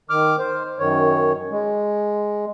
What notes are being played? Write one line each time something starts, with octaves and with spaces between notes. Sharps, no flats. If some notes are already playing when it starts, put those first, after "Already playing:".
D#3 D6 F6
C5
F#2 D#3 C#5
G#3